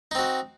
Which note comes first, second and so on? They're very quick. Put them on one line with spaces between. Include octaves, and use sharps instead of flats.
D#4 C4 F#4